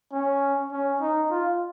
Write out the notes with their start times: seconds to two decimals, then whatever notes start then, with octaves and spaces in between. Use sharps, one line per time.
0.12 C#4
0.72 C#4
1.01 D#4
1.31 F4